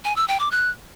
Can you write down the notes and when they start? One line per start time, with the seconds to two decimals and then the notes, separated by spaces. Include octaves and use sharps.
0.05 G#5
0.16 E6
0.28 G5
0.40 D6
0.51 F#6